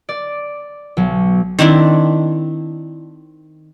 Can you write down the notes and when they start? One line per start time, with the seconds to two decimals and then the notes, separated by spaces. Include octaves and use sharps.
0.09 D5
0.97 B1 F#3
1.59 D#3 C4 D4 E4